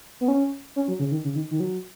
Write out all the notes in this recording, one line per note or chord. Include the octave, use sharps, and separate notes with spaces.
B3
C#4
C#4
F#3
C#3
D#3
C#3
D#3
D#3
F#3